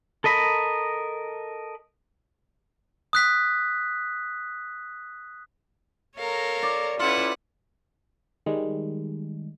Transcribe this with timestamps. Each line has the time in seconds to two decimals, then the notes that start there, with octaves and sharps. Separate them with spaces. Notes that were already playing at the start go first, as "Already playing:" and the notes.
0.24 A4 A#4 D#5 B5
3.13 D#6 F#6 B6
6.17 A4 A#4 C#5 F5 A#5
6.63 D5
6.99 C#4 E4 F4 A4 B4 F#5
8.46 D#3 G3 G#3